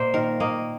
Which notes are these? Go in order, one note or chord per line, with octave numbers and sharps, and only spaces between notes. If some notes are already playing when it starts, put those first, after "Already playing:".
Already playing: A#2 A#3 C5 D#5
D#3 A#4
A#3 D#5